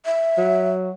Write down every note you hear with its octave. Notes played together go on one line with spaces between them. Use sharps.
E5
F#3